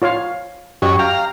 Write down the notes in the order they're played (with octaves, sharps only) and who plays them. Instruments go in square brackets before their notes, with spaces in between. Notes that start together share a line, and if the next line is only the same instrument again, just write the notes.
[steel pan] F4 C#5 F5
[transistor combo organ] F#2 C#4 [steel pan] G4 D#5
[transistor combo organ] F5 A#5 [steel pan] G5